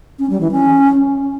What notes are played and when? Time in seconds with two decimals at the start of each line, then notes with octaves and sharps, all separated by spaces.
0.19 C#4
0.30 G3
0.41 E3
0.51 C#4